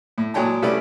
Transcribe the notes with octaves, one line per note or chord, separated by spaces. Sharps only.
A2
A#2 F#3 G#3 C#5 G5 A5
C2 G3 A3 C#4 B4 D5